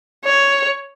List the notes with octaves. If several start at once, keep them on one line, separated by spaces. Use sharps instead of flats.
C#5